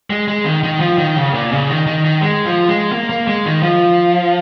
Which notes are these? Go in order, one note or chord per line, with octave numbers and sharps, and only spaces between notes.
G#3
G#3
D#3
D#3
F3
D#3
C#3
A#2
C#3
D#3
D#3
D#3
G#3
F3
G#3
A#3
A#3
G#3
D#3
F3